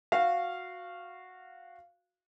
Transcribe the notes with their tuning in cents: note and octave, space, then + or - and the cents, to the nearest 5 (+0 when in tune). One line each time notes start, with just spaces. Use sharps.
F#4 -15 F5 -10